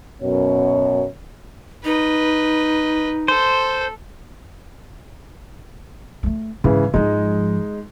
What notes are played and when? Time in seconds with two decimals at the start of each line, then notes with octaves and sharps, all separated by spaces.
0.23 F#2 B2 C#5
1.84 D#4 B4 D#5
3.28 A4 C5
6.23 G#3 A3
6.64 G#2 C#3 E3
6.94 G#2 F3 G#3 D#4